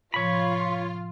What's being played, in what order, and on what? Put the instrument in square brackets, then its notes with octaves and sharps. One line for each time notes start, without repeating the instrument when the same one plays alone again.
[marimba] A2 C3 F3 [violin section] F4 [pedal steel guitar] C#5 B5